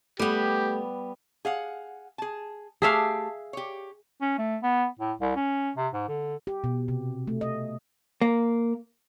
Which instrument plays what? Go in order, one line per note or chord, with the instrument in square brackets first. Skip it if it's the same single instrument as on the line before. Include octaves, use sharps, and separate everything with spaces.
[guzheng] G3 B3 [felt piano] A3 [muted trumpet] G4
[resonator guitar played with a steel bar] G#4 F5 F#5
G#4 A5
[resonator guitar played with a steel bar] A3 G4 A5 [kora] G#4 E5 F5
[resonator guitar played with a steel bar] G4 C#5
[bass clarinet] C#4
A3
B3
A2
C2
C#4
C3
G#2
D3
[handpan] G4
B2
C3
A3
D#5
[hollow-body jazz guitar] A#3